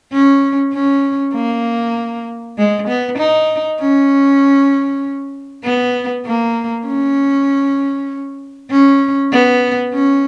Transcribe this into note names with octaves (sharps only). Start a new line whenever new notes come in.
C#4
C#4
A#3
G#3
B3
D#4
C#4
B3
A#3
C#4
C#4
B3
C#4